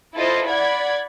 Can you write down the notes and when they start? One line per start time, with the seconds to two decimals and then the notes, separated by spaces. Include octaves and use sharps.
0.14 E4 F4 A4 C5 D#5
0.49 D5 F#5 B5 G#6